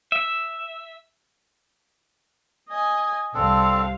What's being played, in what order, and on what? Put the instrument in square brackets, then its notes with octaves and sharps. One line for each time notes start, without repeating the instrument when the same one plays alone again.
[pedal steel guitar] E5
[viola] D#5 G#5
[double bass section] C2 [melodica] C4 D4 A4 [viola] C5 F5